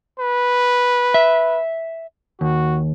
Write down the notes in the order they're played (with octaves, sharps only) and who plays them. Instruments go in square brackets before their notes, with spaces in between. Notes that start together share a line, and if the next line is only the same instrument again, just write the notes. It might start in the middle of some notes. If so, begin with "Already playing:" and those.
[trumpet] B4
[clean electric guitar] E5
[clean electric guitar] D#2 [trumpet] F#4